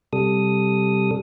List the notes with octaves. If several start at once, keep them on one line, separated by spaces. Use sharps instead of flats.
C3 G3 A4 D#6